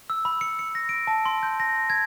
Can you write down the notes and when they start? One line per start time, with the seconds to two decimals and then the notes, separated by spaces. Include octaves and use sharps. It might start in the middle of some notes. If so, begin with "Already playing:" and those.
0.10 E6
0.25 B5
0.41 C#7
0.59 C#7
0.75 A#6
0.89 D7
1.07 A5
1.26 C6
1.43 G6
1.60 A#6
1.90 G#6